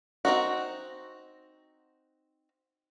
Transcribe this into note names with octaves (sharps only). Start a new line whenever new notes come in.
C4 D#4 F#4